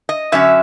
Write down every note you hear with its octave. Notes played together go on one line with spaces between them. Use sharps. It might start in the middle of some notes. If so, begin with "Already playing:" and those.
D#5
F#2 D3 F#3 C#4 E5